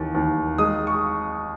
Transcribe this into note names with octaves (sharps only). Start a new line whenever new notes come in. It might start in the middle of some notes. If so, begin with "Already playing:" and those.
Already playing: D#2 E3
D#2
G#3 D#6
C#6